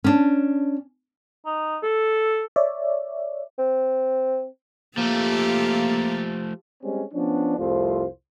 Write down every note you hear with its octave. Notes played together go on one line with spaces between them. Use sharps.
C#4 D4
D#4
A4
C#5 D5 E5
C4
F3 A3 A#3 F4 G4 A4
G3 G#3 C4 C#4
F3 B3 C#4 D4
C2 F2 A3 F4 C5